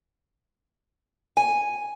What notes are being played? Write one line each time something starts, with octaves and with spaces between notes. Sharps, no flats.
G#5